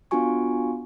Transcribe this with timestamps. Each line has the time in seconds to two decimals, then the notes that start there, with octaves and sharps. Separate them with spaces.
0.11 B3 D4 F4 F#4 G#5 C#6